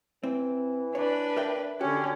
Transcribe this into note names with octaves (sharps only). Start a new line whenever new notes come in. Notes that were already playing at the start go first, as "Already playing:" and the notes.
E3 C4
D4 B4 C#5
A#4 E5 G5
D3 C#4 F#4 G4